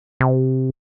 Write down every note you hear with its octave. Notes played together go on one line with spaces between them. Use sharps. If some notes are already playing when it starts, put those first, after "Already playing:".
C3